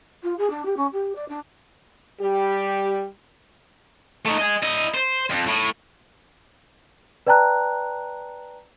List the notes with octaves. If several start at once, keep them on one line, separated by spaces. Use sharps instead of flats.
F4
G#4
D4
G4
C#4
G4
D5
D4
G3 G4
A3 D#4
D#5 G#5
E4 D#5
C5
F2
A2
B4 D5 G5 A5 A#5 F#6